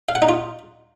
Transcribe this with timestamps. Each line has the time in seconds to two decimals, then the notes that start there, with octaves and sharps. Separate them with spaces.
0.09 F5
0.15 F#5
0.22 D#4
0.29 F4